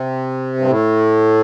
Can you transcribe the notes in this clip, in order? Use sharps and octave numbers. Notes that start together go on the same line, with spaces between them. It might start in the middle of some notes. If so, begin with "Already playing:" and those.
Already playing: C3
G2
A2